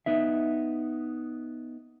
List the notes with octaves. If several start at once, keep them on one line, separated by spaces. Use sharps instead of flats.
B3 D#4 E5